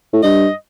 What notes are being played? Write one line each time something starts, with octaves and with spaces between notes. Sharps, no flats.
A2
G2 D#5